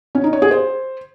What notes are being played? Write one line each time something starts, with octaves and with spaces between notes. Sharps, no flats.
C#4
D#4
C#5
G#4
C5